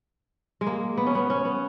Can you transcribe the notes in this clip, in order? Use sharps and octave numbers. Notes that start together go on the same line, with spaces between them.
G#3
A#3
B3
C#4
B3
C#4
B3